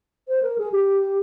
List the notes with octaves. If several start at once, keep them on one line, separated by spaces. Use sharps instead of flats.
C5
A#4
G#4
G4